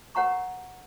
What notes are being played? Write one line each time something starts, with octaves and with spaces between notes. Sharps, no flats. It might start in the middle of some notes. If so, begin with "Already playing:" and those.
A#4 C#5 F#5 A#5 C#6